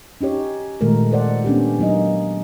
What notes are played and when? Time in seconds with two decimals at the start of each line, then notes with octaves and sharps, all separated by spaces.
0.21 C#4 D#4 G4 C#5
0.81 A#2 D#3 G#3 A3 A#4
1.11 A4 C5 D5 F#5
1.44 B3 C#4 D4 G4
1.79 F#3 A#3 D#4 D#5